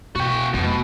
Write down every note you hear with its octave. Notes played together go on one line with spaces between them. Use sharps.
B2 F#4 G5
F1 B2 F#3